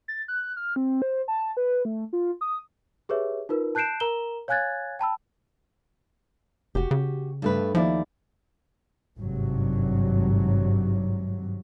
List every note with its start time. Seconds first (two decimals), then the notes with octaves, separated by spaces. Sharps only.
0.08 A6
0.28 F#6
0.57 F6
0.76 C4
1.02 C5
1.28 A5
1.57 B4
1.85 A3
2.13 F4
2.41 D#6
3.09 G4 G#4 B4 C#5 E5
3.49 D#4 F4 A#4 B4
3.75 A5 F#6 G6 C7 D7 E7
4.00 A#4 A#5 E7 G7
4.48 C#5 F5 G#5 F#6 G#6 A6
4.99 G5 A5 B5 E6
6.75 F1 F#4 G4
6.91 C#3
7.42 G2 A3 B4
7.75 D#2 F3 E4 D5
9.18 G#1 G2 C3 F#3